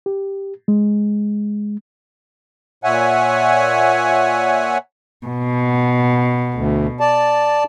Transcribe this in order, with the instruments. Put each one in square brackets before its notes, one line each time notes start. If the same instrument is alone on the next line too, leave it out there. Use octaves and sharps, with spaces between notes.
[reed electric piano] G4
G#3
[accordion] A#2 C#5 E5 F#5 G#5
[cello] B2
[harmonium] D2
D5 A5